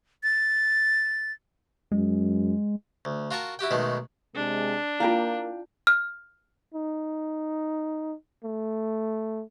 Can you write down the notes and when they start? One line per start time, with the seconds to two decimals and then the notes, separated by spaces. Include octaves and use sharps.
0.23 A6
1.92 F#2 G#3
3.05 D2
3.31 F4 F#4 A#4 A5 C#6
3.59 E4 F#4 G4 G5
3.71 B1 B2 D#3 G#3 A3
4.35 C3 G#3 D4
5.00 A#3 E4 F4 F5 G5
5.87 F6
6.74 D#4
8.44 A3